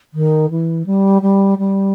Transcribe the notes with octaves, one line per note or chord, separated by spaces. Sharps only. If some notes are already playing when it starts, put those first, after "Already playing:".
D#3
E3
G3
G3
G3